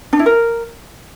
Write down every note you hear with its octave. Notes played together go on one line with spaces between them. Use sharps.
D4
E4
A#4